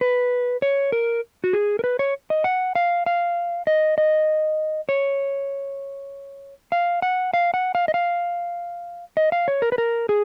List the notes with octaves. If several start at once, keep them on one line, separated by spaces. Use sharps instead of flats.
B4
C#5
A#4
F#4
G#4
A#4
B4
C#5
D#5
F#5
F5
F5
D#5
D#5
C#5
F5
F#5
F5
F#5
F5
D#5
F5
D#5
F5
C#5
A#4
B4
A#4
G#4